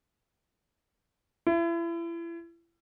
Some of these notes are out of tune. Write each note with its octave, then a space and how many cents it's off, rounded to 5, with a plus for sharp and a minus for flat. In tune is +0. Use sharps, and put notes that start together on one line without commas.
E4 +35